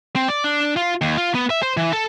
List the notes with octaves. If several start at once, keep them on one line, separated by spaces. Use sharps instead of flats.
C4
D5
D4
F4
D#2
F4
B3
E5
C5
E3
A4